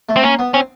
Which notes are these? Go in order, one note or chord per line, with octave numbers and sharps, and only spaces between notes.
A3
C4
A#3 C#4
B3
C4 C#4